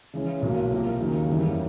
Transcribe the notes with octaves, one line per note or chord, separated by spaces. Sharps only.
C#3 E3 G#3 C#4
B1 B2 F#3 A#3
C3 F3 A#3
D#2 C#3 F#3 A#3 D#4
F#1 E2 C#3 E3 G3